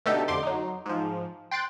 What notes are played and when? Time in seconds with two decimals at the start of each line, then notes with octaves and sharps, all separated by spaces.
0.06 B2 D3 A3 D#4 G4 A4
0.28 F2 D3 C6 D6
0.43 F#3 D#4
0.86 G#2 F3
1.51 G5 C6 F#6 A6 D7